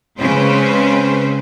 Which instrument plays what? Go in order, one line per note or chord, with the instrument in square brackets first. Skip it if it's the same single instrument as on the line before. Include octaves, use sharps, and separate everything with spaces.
[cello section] C#3 G#3 C4 C#4 B4 C5